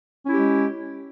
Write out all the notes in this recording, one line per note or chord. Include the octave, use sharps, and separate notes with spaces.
G#3 C#4 E4 G4